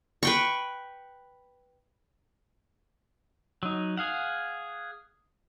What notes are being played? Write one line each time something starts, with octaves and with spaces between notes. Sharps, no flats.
B4 G5 C#6
F#3 D#4
G#4 F5 F#5